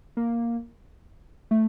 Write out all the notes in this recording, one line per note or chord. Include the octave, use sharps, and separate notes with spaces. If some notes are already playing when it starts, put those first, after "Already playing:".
A#3
A3